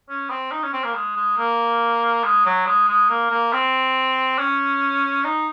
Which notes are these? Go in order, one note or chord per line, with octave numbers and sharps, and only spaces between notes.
C#4
C4
D#4
C#4
C4
A#3
G#3
G#3
A#3
G#3
F#3
G#3
G#3
A#3
A#3
C4
C#4
D#4